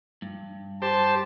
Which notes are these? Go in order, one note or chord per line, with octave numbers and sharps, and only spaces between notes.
G2
G4 C5 A5